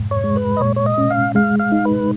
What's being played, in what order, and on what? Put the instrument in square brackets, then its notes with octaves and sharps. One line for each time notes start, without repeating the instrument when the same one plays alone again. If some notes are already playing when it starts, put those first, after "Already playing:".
Already playing: [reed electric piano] F2 G#2
[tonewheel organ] C#5
[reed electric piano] G#3
[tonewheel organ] B4
D#5
[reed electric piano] A#2 [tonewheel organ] C#5
[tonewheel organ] C#5
D#5
[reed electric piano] C#4
[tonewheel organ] F5
[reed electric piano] G#3 [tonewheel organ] F5
[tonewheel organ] F5
[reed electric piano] D#4
[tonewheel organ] B4